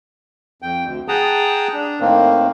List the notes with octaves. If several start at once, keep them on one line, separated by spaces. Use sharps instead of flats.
F2 G5
D2
G#4 F#5 G5 A5 A#5 D#6
D4
A2 D#3 A#3 C4